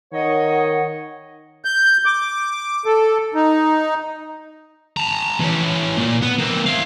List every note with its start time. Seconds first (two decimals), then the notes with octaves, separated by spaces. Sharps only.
0.13 D#3 C#5 D#5 F#5
1.65 G6
2.06 D6
2.85 A4
3.35 D#4
4.97 A5 A#5
5.40 E3 C#4
5.97 A#2
6.22 B3
6.38 A#3 C4
6.66 E4 F5